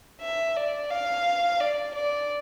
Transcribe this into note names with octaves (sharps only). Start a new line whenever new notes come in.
E5
D5
F5
D5
D5